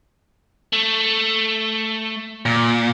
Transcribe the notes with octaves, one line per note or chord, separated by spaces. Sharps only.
A3
A#2